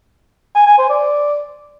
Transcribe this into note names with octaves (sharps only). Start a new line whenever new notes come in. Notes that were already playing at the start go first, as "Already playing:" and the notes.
G#5
G#5
C5
D5